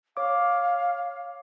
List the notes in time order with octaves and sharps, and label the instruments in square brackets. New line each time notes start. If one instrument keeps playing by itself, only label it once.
[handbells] C#5 D6 [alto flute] F5